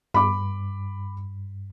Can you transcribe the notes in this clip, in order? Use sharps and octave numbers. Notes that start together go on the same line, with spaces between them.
G2 B5 D6